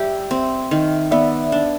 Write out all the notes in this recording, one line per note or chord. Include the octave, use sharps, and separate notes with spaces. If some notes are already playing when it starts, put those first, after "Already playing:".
Already playing: G3 G4 E5
C4
D#3
B3 D5 E5
D4